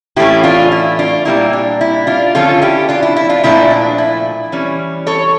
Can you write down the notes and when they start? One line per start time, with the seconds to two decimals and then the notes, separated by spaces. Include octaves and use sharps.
0.16 A2 E3 A3 C#4 E4 G4
0.44 D4 F4
0.72 E4
0.99 D4 F4
1.25 A#2 G3 A#3 D4 E4
1.53 D4
1.81 E4
2.07 D4 F4
2.35 D3 F3 C#4 F4 A4
2.62 E4 G4
2.89 D4 F4
3.03 E4
3.16 E4
3.29 D4 F4
3.43 A#2 F3 A3 D4 E4
3.70 D4
3.98 E4
4.52 E3 G3 C#4
5.07 A4 C#5